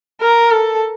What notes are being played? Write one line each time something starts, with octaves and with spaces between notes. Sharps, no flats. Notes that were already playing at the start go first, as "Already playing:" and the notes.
A#4
A4